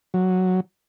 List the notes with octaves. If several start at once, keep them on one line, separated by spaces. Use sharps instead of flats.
F#3